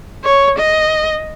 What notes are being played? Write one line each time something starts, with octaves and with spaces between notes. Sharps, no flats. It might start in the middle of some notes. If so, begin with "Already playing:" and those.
C#5
D#5